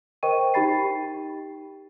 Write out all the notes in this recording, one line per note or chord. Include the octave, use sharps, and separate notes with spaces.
A#4 C5 D#5 G5 C#6 D#7
D#4 G4 G5 B5 A6 C7